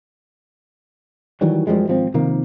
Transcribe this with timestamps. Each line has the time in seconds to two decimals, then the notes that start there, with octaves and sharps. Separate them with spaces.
1.41 D#3 E3 F#3 G3
1.67 F#2 F3 G3 G#3
1.87 G#1 F3 C4
2.14 C3 D#3 F3 A#3